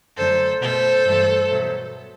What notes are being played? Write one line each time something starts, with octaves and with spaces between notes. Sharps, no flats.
F#2 D3 F#3 A3 A4 C5
B2 A3 A4 C5
G2 E3 A3
E2 B2 F#3 A3